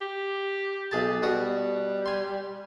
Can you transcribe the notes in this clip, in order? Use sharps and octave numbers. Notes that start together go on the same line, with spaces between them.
G4
B1 G#4 A5
B2 G3 F#4 D#6
G#5 C6